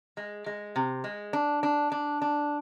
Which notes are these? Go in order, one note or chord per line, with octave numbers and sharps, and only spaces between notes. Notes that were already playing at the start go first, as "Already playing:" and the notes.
G#3
G#3
C3
G#3
D4
D4
D4
D4